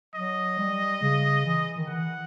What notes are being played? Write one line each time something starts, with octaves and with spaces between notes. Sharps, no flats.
F#3 D#5
G3
C#3
E3
D#3
E3 F#5